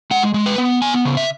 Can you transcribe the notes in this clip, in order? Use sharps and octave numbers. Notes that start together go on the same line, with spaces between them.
G#3 F#5
G#3
B4
B3
B3 G#5
C#3
E5